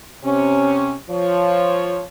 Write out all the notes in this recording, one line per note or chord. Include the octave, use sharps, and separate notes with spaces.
C3 C#4
F3 C#5